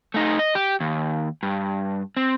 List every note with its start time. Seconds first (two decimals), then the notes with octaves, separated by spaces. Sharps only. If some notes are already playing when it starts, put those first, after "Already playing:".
0.14 A3 D#4
0.39 D#5
0.55 G4
0.80 D#2
1.43 G2
2.17 C4